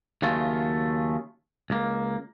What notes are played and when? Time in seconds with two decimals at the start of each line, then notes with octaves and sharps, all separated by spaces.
0.22 D#2 C#3 F#3 A3 F4
1.70 C#2 A#3